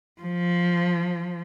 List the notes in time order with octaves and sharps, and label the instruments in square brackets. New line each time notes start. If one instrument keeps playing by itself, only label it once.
[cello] F3